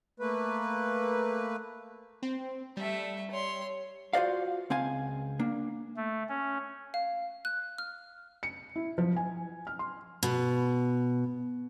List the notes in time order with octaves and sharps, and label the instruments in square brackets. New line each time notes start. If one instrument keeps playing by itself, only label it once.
[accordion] A3 A#3 B4
[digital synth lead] C4
[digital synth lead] G3 [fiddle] A3 E5
[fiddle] C#5 C6
[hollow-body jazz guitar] F4 F#4 C5 D5 F5
C#2 C4 F5 G#5
A#3 D4
[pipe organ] A3
C#4
[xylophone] F5
F#6
F6
[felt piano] C#7
E4
F3
G#5
F6
C6
[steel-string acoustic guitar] B2